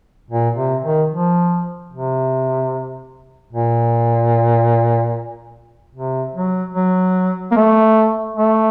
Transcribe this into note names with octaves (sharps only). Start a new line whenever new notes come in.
A#2
C3
D#3
F3
C3
A#2
C3
F#3
F#3
A#3
A3
A3